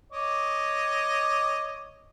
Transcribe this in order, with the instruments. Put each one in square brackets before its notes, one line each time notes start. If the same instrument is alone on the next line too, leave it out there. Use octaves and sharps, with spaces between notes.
[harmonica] C#5 D#5 D6